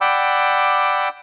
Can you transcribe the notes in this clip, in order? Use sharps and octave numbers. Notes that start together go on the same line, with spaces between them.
D5 F#5 G5 B5 D6 E6